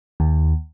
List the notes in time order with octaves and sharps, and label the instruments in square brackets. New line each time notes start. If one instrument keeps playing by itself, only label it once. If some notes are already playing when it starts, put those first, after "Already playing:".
[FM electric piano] D#2